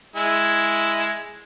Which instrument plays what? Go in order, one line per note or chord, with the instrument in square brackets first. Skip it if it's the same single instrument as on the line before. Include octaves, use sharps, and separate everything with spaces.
[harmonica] G#3 E4 G#5